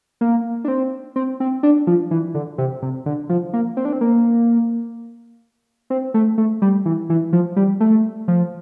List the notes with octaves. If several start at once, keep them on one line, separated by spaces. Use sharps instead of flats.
A#3
D4
C4
C4
C4
D4
F3
E3
D3
C3
C3
D3
F3
A#3
C4
D4
C4
A#3
C4
A3
A3
G3
E3
E3
F3
G3
A3
F3